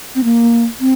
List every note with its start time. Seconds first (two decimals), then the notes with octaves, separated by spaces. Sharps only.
0.15 C4
0.24 A#3
0.80 C4